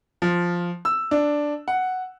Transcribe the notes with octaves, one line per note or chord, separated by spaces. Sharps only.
F3
E6
D4
F#5